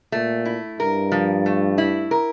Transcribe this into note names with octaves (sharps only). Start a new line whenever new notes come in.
A#2 A3
E4
G2 A#4
F3
A3
E4
A#4